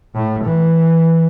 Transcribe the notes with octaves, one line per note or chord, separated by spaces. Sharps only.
A2
E3